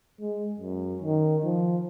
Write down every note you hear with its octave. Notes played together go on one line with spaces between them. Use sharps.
G#3
F#2
D#3
F3